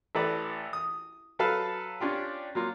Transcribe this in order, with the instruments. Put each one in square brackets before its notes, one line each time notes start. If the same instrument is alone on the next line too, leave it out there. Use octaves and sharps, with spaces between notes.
[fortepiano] A1 A4 B4 D5 A#5
D#6
F#3 A4 B4 F5 A5
C#4 D4 F4 G4
F#3 A#3 F4